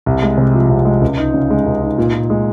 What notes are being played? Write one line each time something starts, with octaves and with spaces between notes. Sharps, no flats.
C2
G#3
C3
F3
C2
G#3
C#2
D#4
C#3
G#3
C#2
D#4
A#2
A#2
G#3